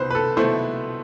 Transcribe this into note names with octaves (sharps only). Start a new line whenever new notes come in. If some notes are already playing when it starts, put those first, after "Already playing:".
Already playing: C2 B2 B4 C5
B4
A4
B2 A3 E4 C5